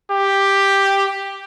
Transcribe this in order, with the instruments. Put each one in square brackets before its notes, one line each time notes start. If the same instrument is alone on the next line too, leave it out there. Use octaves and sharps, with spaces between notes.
[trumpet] G4